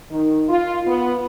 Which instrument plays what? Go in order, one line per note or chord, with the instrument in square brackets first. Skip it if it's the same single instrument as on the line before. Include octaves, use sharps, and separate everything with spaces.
[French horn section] D#3
F4
B3